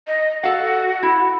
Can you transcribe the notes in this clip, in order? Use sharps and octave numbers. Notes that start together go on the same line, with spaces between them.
D#5
F#4 A4 F5 F#5
E4